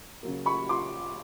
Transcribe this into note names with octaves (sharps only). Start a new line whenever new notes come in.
C#3 F#3 A#3
B5 C#6
C6 D6